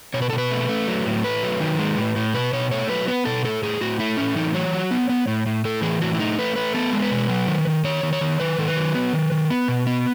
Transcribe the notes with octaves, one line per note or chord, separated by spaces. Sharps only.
B2 C#5
B4
B2 A4
B4
A3
A3
F#3
A2
A3 B4
F#3
D#3
G#3
A2
A2
B2 B4
B2 C#5
A3 C#5
F#3 B4
B3 B4
B2 A4
A2 A4
A2 G#4
A2 F#4
A3 E4
A2 C#4
E3 D#4
F#3 C#5
F#3
B3
B3
A2
A2
A2 A4
E3 G#4
A2 F#4
E4
A3 D#4
A3 B4
A3 B4
B3 A4
G#3
B4
B2
F#3
D#3
D#3
D#3 C#5
D#3
C#5
D#3
D#3 B4
D#3 A4
B4
F#3
B3
D#3
D#3
B3
B2
B3